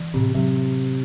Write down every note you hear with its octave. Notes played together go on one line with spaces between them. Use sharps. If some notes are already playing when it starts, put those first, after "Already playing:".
Already playing: E3
A2 C3
C3 F#3